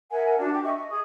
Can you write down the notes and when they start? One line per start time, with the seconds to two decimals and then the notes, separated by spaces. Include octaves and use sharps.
0.11 A#4 E5 F#5 G#5
0.38 D4 F#4 A5
0.52 G4 D6
0.63 D#5 E5 C#6
0.77 D#5
0.90 G#4 D#6